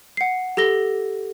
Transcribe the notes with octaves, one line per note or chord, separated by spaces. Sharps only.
F#5 C7
G4 A4 A#6 G7